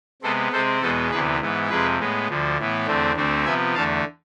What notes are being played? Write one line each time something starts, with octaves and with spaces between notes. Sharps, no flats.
C3 G#3 B3 A4 C5
C3 G#3 C4 A4 C5
E2 B2 G#3 B3 A4 C5
D2 C3 E3 B3 G#4 B4
G#2 E3 B3
F2 C3 G#3 G#4 B4
A2 G#3 B3
D2 D3 F3
A2 E3 B3
E2 D3 A3 C4
D2 D3 A3 C4
C3 F3 B3 E5 G#5
E2 D3 A3 F5 A5